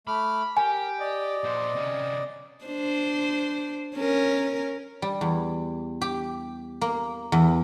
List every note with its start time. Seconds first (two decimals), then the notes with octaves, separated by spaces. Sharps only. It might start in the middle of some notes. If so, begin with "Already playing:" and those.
0.07 A3 B5 D6 F6
0.57 G4 A#4 G#5
0.99 D5 D#5
1.44 A#2 C5
1.76 C3 C#4
2.65 D4 C5
3.96 C#4 A#4
5.02 G3
5.21 E2
6.01 G4
6.81 A#3
7.32 E2